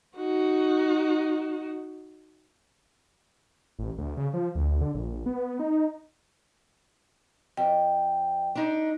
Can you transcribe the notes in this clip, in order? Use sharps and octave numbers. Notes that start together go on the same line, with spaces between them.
D#4 F#4
A1
D2
C#3
F3
D2
D3
A#1
B3
D#4
F2 G5
D4 D#4